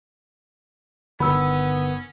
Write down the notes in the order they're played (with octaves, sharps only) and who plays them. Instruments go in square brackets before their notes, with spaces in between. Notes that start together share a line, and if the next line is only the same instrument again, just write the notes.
[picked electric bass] G1 D3 D#3 [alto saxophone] B3 [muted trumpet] C#4 [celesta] B5 E6